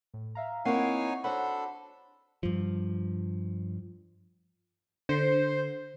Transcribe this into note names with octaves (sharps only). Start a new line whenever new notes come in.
A2
E5 F5 A#5
A#3 C4 D#4 E4 C#5 F#5 G#5 C7
D4 F#4 A4 C5 C#5 F#5 B5
G2 F3
D3 C5